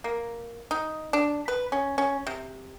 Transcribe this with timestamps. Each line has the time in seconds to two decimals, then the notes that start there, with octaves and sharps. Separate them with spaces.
0.04 A#3
0.71 D#4
1.13 D4
1.48 B4
1.72 C#4
1.98 C#4
2.27 C3